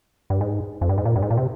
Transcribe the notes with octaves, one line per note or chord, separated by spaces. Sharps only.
G2
G#2
F2
G2
G#2
A#2
G2
G#2
A#2
C3